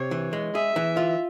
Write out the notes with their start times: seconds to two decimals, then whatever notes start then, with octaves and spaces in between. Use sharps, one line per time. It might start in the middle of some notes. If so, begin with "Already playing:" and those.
Already playing: C3 C#5
0.11 E3
0.33 G#3
0.55 G#4 E5
0.76 E3
0.97 F4